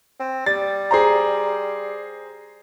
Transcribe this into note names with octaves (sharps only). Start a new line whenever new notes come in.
C4
G3 A6
G#4 C5 A#5